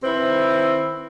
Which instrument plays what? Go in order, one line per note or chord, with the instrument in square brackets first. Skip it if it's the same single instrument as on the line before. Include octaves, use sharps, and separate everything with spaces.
[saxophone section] D#3 C4 E4 B4 C5